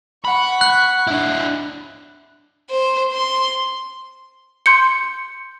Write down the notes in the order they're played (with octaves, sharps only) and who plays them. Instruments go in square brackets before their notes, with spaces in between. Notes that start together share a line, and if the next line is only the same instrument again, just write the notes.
[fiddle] F#5 C#6 [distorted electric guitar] B5
[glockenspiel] F#6
[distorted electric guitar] D4 E4
[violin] C5
C6
[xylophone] C6 G6 C#7